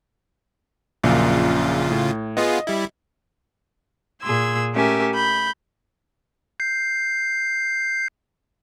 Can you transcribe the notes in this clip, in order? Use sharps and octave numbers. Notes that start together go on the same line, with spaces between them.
A#1 F#2 A#2 C#3 F4
A2
B3 F4 G#4 D#5
G3 E4
A#2 G#4 C6 E6 G#6
A3 C#4 G4 A#4 E5 G#5
B5 G6
G6 C7